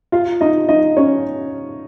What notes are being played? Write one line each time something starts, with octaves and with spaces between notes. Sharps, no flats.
F4 F5
D#4 D#5
D#4 D#5
C#4 C#5